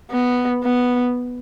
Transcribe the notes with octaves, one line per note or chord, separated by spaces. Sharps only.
B3
B3